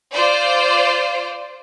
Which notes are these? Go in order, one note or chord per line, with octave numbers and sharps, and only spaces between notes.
F4 C5 D5